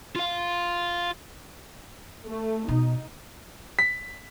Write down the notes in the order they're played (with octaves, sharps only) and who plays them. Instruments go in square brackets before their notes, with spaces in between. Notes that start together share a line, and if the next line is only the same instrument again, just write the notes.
[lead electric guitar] F4 F5
[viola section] A3
[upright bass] B2 [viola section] D#4
[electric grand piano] B6